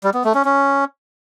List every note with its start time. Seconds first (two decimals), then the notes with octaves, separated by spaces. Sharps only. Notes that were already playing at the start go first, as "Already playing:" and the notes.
0.04 G3
0.14 B3
0.24 A3
0.34 C#4
0.45 C#4